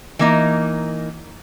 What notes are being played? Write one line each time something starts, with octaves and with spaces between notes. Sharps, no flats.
E3 A#3 D#4